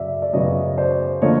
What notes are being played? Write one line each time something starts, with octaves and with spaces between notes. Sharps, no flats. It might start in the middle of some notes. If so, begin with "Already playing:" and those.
Already playing: F#2 C#3 D5 E5
D5
F#2 C#3 F#3 B3 C#5 D#5
C5 D5
D3 F3 A#3 C#5 D#5